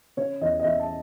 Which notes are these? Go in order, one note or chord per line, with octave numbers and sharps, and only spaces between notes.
C#3 C#5
E2 D#5
D#5
E2 E5
A5